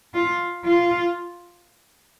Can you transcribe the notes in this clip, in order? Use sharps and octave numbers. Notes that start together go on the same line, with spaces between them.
F4
F4